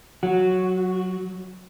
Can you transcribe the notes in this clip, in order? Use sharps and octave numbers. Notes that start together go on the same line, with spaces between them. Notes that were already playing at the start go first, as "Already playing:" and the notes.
F#3 F#4